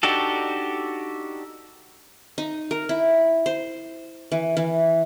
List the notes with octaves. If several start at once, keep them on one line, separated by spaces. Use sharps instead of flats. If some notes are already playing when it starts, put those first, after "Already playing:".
D4 D#4 F#4 G4 A4
D#4
A#4
E4
C5
E3
E3